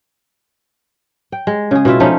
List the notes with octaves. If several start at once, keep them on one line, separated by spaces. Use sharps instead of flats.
G5
G#3
C#3 G#4
B2 E4 F4 E5
F3 A3 C#4 D#4